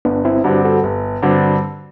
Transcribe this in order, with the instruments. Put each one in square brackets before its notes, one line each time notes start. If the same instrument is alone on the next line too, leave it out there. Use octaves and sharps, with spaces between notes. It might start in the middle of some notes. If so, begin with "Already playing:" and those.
[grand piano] G1 [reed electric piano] B3 D4
[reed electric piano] C4 E4
[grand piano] G2 D3 G3 C4 [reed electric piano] D4 F#4
[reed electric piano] F#4 A4
[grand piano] G1
[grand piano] G2 D3 G3 C4 [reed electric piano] D4 F#4